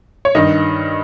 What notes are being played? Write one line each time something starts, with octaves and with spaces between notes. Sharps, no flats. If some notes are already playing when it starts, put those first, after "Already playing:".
C#5
G2 D#3 D#5